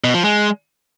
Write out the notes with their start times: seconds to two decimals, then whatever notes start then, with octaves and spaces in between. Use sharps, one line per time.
0.04 B2
0.14 F3
0.24 G#3